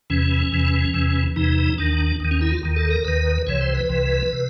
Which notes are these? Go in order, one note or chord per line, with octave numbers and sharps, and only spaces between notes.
E2 C3 E3 C#4
E2 C3 E3
E2 C3 E3
E2 C3 E3 D#4
D#2 D#3 D4
D#2 D#3
C#4
E4
F4
D#2 D#3
A4
A#4
D#2 D#3 B4
C2 C3 E3 C#5
C5
B4
C2 C3 E3
C3